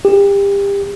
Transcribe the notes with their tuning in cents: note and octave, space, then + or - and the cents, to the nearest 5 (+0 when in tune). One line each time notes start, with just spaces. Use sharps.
G4 +30